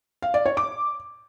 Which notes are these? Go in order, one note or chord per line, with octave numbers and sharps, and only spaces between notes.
F5
D5
C#5
D6